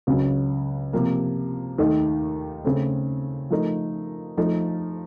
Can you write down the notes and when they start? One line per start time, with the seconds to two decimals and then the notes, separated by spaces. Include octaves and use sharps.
0.07 C#2 C#3 F#3
0.93 C3 F3 A#3
1.78 D#2 D#3 A3 D#4
2.64 C#3 A3 C4
3.50 F3 A3 D#4 A#4
4.37 F3 A3 D#4